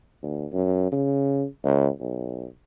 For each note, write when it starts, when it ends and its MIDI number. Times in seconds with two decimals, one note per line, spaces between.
0.23 0.47 38
0.52 0.90 42
0.92 1.45 49
1.64 1.88 37
2.00 2.46 35